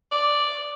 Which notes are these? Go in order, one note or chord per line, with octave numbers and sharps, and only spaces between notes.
D5